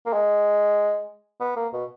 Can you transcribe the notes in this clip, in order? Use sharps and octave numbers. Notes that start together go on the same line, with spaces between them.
A#3
G#3
B3
A#3
B2